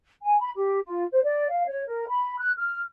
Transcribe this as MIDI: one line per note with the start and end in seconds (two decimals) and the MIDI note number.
0.22 0.39 80
0.40 0.50 83
0.56 0.79 67
0.85 1.04 65
1.11 1.22 72
1.23 1.47 74
1.50 1.67 77
1.68 1.86 73
1.86 2.04 70
2.07 2.38 83
2.39 2.51 90
2.57 2.81 89